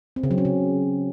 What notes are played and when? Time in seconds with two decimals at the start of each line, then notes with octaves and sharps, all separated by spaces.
0.16 C4
0.23 C#3
0.31 F#3
0.38 C#4
0.45 C#3